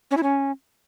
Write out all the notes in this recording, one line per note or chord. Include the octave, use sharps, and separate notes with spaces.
C#4
E4
C#4